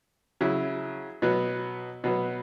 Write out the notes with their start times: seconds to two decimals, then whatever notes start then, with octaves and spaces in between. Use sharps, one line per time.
0.41 C#3 F#3 E4
1.22 B2 F#3 B3
2.04 B2 F#3 B3